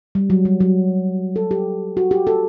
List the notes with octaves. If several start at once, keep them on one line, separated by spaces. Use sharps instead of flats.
G3
F#3
G3
F#3
A4
G4
F#4
G4
A4